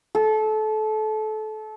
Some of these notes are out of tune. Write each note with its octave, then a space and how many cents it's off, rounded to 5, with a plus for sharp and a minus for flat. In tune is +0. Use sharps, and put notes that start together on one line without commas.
A4 -25